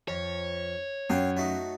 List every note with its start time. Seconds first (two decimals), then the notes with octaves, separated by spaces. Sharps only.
0.08 F2 C#5
1.10 F#2 F5 G5
1.37 F#3 A3 D#4